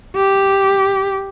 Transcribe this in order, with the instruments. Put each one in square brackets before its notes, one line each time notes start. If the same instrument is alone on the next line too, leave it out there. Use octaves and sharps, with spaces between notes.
[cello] G4